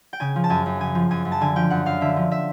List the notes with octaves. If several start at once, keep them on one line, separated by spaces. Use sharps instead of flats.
G5
C#3 G#5
F3
A5
F#2 G#5
F#2
C#3 G#5
F3
F#2 G#5
F#2
A5
D3 G#5
F3 G5
F#2 F#5
F#2 F5
D3 E5
F3
E5